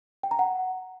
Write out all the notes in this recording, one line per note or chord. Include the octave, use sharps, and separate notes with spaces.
G5
A#5
F#5